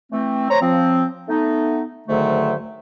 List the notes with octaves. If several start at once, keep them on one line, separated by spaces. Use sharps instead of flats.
E3 A3 C4
C5 C#5 A#5
F3 C4
A3 B3 D#4
D2 G#2 D3 D#3 F#3 A3